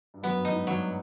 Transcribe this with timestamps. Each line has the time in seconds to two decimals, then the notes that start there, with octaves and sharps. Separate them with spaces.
0.14 G2
0.23 F#2 B3
0.37 G2
0.45 D#4
0.52 G#2
0.67 G2 F#3